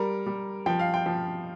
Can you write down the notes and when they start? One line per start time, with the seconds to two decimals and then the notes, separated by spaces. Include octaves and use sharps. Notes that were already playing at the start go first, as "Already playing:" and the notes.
Already playing: G3 A#4
0.26 G3
0.66 F3 G5
0.79 F5
0.94 G5
1.06 F3